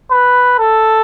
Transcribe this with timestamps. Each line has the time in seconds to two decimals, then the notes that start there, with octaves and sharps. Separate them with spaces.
0.11 B4
0.59 A4